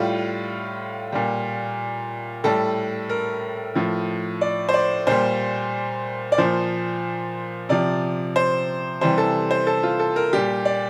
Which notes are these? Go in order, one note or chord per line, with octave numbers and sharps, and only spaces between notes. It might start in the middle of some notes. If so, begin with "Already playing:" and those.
Already playing: A2 G3 F4
A#2 G3
A2 G3 A4
A#4
A2 F3
D5
C5
D5
A#2 G3 C5
D5
A#2 F3 C5
C3 F3 D5
C5
C3 E3 G3 C5
A4
C5
A4
F4
A4
A#4
A#2 G3 G4
D5